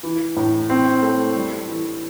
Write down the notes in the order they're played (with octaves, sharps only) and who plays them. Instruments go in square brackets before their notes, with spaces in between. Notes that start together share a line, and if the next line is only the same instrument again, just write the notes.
[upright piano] E3
A2
C4
A3
G3
E3